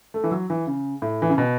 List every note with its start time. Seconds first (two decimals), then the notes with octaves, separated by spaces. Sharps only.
0.14 A3
0.24 E3
0.31 F#3
0.50 E3
0.67 C#3
1.02 A2
1.22 E3
1.30 C#3
1.38 B2